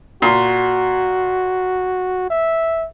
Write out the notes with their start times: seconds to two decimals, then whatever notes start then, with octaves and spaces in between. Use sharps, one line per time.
0.22 A#2 F#4 C6
2.30 E5